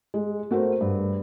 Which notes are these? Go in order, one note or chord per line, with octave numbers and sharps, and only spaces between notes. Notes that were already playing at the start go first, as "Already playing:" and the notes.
G#3
A3 F#4 A#4 C5
G2